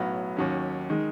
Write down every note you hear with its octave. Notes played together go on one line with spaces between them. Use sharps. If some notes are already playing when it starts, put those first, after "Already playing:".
Already playing: B1 A2 F#3 B3
D#2 D#3 F#3 C#4
D#3 G#3